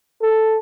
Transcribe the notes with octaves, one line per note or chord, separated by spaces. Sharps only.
A4